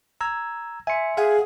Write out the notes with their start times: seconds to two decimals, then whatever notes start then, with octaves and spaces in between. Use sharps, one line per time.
0.21 A#5 E6 G#6
0.87 E5 G#5 C6 C#7
1.17 G#4 F5 F#5 G#5